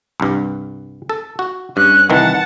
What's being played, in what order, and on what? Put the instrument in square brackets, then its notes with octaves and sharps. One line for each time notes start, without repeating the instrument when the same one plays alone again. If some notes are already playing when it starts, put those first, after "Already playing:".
[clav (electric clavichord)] C2 G2
A4
F#4
[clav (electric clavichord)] G2 [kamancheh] C#4 F#6
[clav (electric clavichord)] C2 D#3 E3 [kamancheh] F#5 A5